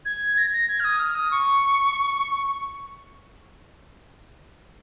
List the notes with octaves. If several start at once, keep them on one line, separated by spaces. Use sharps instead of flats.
G#6
A#6
A#6
G#6
F6
D#6
F6
D#6
C#6